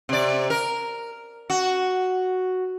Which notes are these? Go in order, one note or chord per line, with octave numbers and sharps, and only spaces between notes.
C3 D5
A#4
F#4